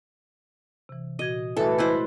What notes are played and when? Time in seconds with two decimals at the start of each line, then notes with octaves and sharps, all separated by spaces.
0.89 C3 E3
1.19 A#2 F#4 D#5 G#6
1.57 E3 G3 A3 F#4 A4
1.78 G#3 E4 B4 C5 D#5 E6